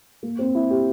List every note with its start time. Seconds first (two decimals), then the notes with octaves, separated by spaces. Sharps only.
0.23 A#3
0.39 C4
0.55 E4
0.70 G4